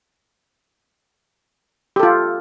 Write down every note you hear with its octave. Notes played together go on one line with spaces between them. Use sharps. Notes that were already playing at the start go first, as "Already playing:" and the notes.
F4 G4 A4